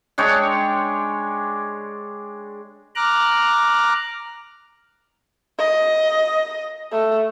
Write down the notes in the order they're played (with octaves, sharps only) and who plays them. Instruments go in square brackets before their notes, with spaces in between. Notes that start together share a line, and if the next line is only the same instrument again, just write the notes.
[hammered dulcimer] G#3 D4 C#5 G5
[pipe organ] A#5 D6 F6 F#6
[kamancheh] D#5
A3